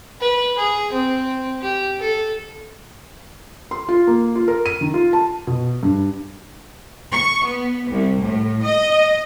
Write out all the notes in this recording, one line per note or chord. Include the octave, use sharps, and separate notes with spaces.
B4
G#4
C4
G4
A4
C6
F4
A#3
F4
A#4
D#7
D#3
F4
A5
B2
G2
C#6
B3
C2
A2
D#5